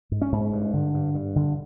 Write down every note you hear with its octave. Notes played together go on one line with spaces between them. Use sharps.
G#2
C#4
G#2
G2
D3
G2
G2
D3